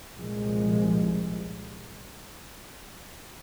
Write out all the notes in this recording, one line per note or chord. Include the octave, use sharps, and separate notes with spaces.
C2 A#2 F3 G#3